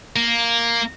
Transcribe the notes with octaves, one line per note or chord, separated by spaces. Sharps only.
A#3